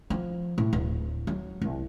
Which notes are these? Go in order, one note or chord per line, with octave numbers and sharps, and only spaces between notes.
F3
A2
D1
F#3
C2